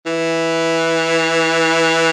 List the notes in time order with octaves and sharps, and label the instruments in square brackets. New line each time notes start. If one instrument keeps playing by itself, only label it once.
[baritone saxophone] E3